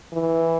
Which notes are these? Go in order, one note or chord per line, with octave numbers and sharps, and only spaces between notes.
E3